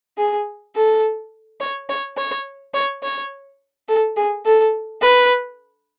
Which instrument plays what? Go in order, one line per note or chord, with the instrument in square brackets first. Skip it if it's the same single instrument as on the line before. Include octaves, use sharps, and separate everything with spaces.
[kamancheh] G#4
A4
C#5
C#5
C#5
C#5
C#5
A4
G#4
A4
B4